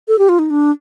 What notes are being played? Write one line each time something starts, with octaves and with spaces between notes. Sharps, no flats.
A4
G4
F4
D#4
D4